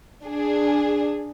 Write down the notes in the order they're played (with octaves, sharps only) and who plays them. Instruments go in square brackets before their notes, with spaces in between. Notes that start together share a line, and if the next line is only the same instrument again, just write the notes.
[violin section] D4 G#4